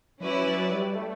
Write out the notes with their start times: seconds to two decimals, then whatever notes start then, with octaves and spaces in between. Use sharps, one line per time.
0.19 F#3 C#4 E4 B4 D5
0.45 F#3
0.70 G3
0.95 A3